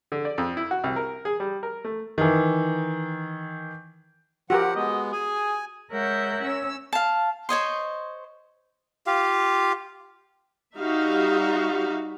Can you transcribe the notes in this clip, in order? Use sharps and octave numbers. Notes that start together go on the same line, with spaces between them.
D3
D5
F2
E4
F#4
C2
A#4
G#4
G3
A#4
A3
D#3 E3
F3 F#4 G4 A#4 F#5
G#3 B3 D#5
G#4 G#5
G#3 A#4 C#5 E5 F#5 G6
C#4 E6
F5 A5
C5 C#5 D#5 C6
F4 G4 F5
G3 D#4 F#4 E5 F5